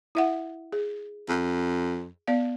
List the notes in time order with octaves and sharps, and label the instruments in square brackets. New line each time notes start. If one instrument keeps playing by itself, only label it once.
[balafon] E4 E5 F#5
G#4
[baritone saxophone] F2
[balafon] B3 D5 F5